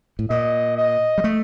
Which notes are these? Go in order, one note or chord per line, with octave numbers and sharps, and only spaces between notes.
A2
A#2 D#5
D#5
G3
A3